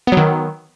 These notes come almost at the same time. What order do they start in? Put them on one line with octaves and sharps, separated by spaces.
B3 F#3 D#3